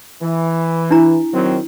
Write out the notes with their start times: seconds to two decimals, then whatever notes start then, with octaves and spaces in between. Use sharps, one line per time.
0.21 E3
0.90 D4 E4 A#5
1.33 D#3 F#3 C4